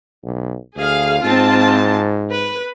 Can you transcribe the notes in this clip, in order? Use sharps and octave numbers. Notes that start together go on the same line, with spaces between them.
B1
D2 G#4 F5
G#2 C4 F4 A5
B4